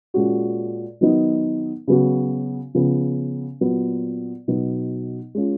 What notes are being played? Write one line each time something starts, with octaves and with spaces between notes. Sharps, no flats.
A#2 G#3 C#4 F#4
D#3 F#3 B3 D#4
C#3 F#3 B3 F#4
C#3 F3 B3
A#2 F#3 B3
B2 F#3 B3 D#4
G#3 C#4 F4